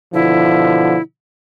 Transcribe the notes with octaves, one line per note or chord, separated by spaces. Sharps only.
B2 D3 F3 E4